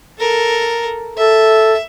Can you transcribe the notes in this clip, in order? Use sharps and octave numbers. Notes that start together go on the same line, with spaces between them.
A4 A#4
A4 E5